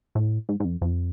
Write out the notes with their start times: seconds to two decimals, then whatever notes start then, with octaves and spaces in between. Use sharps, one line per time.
0.15 A2
0.49 G#2
0.60 G#2
0.65 F2
0.82 F2